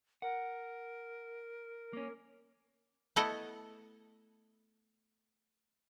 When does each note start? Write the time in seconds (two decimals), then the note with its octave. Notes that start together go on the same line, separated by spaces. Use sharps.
0.22 A#4 F#5
1.93 A#3 C#4
3.16 A3 B3 E4 A4 D#5 F#5